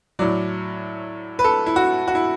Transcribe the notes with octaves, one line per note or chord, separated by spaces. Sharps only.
A2 F#3 D5
B4
A4
E4
F#4
F#4
E4